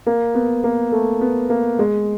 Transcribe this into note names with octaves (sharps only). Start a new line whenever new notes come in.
A#3
B3
A#3
A3
B3
A#3
G#3